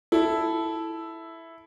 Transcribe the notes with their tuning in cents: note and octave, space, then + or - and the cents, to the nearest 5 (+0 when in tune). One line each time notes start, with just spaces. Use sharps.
E4 +0 A4 -5